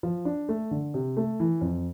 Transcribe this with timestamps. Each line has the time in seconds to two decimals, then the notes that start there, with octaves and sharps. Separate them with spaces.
0.03 F3
0.25 D4
0.49 A3
0.71 D3
0.94 C3
1.17 A3
1.40 E3
1.61 F2